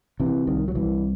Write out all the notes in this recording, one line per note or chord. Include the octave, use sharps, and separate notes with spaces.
C3 E3
C2 D#3
F#3
C2 E3